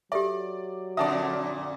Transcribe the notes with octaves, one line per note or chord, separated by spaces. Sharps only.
F#3 G4 A4 D5 E5
F2 A#2 D3 D5 E5 A5 D#6